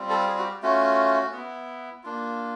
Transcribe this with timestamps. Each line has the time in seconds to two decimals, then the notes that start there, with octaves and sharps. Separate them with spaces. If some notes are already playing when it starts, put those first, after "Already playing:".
Already playing: G3 C4 F4
0.09 A4
0.27 G#4
0.38 F#4
0.44 G4
0.62 A3 C#4 F4 F#4
1.33 B3 E4
2.03 A#3 D4 F4